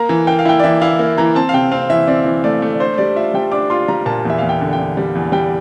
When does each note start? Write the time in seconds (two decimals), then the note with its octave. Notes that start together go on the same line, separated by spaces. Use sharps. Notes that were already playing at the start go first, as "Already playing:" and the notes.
Already playing: A#3 A#5
0.09 E3
0.27 A#3 G5
0.39 F5
0.46 E4 G5
0.59 D5
0.64 E3 E5
0.81 E4 F5
0.99 A#3
1.18 E3 A#5
1.35 C4 A5
1.49 F5
1.53 C3 G5
1.72 C4 F5
1.90 E3 E5
2.07 C4 D5
2.26 E3
2.44 A3 D5
2.62 A3
2.74 D5
2.80 D4 C5
2.98 G3 D5
3.16 F4 E5
3.34 G3 G5
3.52 D4 D6
3.70 F4 C6
3.88 G3 A#5
4.06 A#2 A5
4.25 E2 E5
4.38 E2 F5
4.49 G5
4.61 D3
4.73 G5
4.79 D3
4.97 G3
5.15 E2
5.32 G3 G5